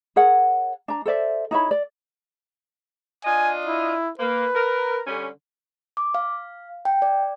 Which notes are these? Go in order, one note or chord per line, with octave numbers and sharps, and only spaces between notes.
G#4 A#4 C#5 F#5
D4 A#5
A4 C5 D5 E5
D#4 E4 C#5 B5
D5
D4 F4 D#5 G#5
E4
A#3 B4
A#4
D3 G3 C#4
D6
F5
G5
D5